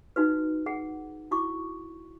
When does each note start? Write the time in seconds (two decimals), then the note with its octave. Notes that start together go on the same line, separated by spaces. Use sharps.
0.16 D#4 F#4 B4
0.66 G#4 F#5
1.31 E4 F#4 C#6 D6